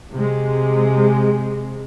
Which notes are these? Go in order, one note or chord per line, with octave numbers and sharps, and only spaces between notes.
C3 G#3